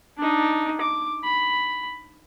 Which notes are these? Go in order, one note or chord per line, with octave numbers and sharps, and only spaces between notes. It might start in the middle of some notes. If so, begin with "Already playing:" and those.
D4 D#4
D6
B5